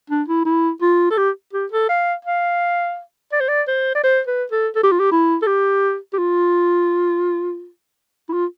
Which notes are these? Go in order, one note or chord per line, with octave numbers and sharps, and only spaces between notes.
D4
E4
E4
F4
A4
G4
G4
A4
F5
F5
D5
C5
D5
C5
D5
C5
B4
A4
A4
G4
F4
G4
E4
A4
G4
G4
F4
E4
F4